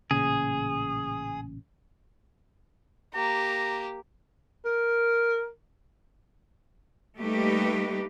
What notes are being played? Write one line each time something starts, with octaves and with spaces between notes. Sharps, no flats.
A1 A#2 C#3 G#4
A#3 G4 A#5
A#4
G3 A3 A#3 D#4 G4 B4